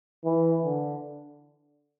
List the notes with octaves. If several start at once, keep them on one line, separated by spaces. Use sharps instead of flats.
E3
D3